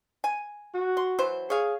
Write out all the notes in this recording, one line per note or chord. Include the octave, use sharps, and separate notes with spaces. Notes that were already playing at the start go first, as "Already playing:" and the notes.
G#5
F#4
C6
E3 F#3 C5
G#4 C#5 F5